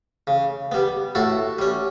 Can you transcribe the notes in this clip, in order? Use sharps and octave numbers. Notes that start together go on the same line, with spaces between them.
C#3
G3 B3
A2 F#4 A4
G3 C#4